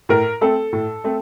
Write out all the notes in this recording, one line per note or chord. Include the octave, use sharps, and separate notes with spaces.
A2 A#4
A3 C4 A4
A2
A3 C4